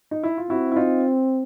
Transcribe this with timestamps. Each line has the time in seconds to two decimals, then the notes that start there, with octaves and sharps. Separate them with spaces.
0.11 D#4
0.23 E4
0.38 F4
0.50 C4 E4 F#4
0.72 E4
0.76 D#4 F4